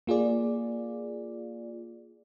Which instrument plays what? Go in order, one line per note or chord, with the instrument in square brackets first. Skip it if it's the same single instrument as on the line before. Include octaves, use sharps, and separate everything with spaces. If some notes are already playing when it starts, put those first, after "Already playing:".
[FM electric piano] A#3 F4 G#4 D5